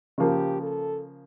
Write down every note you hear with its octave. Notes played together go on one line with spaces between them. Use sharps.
C#3 F3 A#3 G4
A4